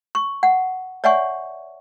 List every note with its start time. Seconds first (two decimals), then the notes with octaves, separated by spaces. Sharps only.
0.15 C#6
0.43 F#5
1.04 C#5 D5 E5 F#5 G#5 C#6